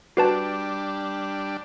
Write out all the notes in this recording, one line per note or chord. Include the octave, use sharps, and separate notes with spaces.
G3 D4 F#4 B4 A5